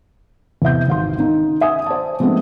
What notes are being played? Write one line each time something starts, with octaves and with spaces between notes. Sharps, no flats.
E2 C3 E5 G6
G#1 F5 C6
D#3 C#4 D#4
E5 G#5 D#6
C5 D5 A5
F3 G#3 A3 B3 C4 D4